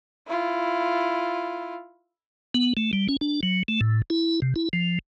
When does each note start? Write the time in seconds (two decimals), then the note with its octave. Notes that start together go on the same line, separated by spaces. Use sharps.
0.27 E4 F4
2.54 B3
2.77 A3
2.93 G3
3.09 C#4
3.21 D4
3.43 F#3
3.68 A3
3.81 A2
4.10 E4
4.42 C3
4.56 E4
4.73 F3